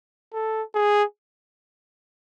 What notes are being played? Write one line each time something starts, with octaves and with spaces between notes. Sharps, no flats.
A4
G#4